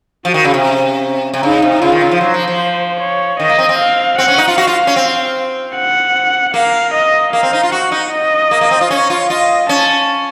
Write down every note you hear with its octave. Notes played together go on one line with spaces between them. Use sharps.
F3 F#4
D#3
C#3
C3
C#4
C3
C#3 D#4
C3
C#3 F4
D#3
C#3
F3
F#3 C5
F3
F3
C#5
D#3 D#5
A#3
C4
C4
F5
C4 F#5
C#4
D#4
F4
F#4 F5
F4
C#4
C4
F#5
A#3 F5
D#5
A#3 F5
C4
D#4
F4
F#4 F#5
D#4
D#5
A#3
A#3
C4
F4
C#4 C#5
F4
F4 D#5
C#4 A5